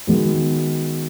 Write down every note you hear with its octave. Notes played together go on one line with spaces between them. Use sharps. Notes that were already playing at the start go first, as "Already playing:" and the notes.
D#3 G#3 B3 F#4